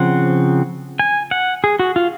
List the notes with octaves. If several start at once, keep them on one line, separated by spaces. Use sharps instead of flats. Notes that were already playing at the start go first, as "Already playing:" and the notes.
Already playing: C#3 F3 C4 F#5
G#5
F#5
G#4
F#4
F4